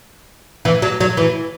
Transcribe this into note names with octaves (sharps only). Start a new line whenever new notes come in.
E3
F#3
F#3
E3